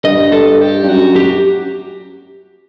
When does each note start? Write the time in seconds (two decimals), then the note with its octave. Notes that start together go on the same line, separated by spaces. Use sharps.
0.04 G2 D#5
0.32 A4
0.61 G4
0.84 G2
0.88 F#2 F#4
1.16 G4